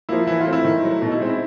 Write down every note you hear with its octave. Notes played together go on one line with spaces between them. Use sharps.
F3 A#3 E4
E3 E4
F4
A3 C4
E4
D#3
F#3 A3
B2 D#4
E4
G#3 C4 D#4
E4